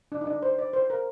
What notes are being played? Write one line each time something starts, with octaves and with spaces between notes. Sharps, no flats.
D4
D#4
D4
C5
D5
C5
A#4